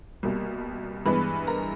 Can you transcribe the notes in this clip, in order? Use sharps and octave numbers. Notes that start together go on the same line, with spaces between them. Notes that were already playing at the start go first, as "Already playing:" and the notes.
C2 B2 G3 A#3
G2 E3 G#3 B3 B4 B5
A#4 A#5